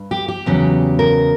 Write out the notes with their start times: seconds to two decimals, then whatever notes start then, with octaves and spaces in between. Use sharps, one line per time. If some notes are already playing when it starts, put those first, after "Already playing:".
Already playing: G2
0.11 G4
0.28 G4
0.46 E2 C#3 F#3
0.99 A#4